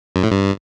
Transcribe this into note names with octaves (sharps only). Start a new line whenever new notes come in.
F#2
A2
G2